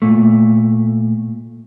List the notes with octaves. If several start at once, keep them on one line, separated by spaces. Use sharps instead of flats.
A#2 A3